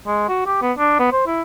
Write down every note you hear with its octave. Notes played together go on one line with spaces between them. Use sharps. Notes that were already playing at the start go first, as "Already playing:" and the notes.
G#3
F#4
G4
B3
D4
B3
C5
E4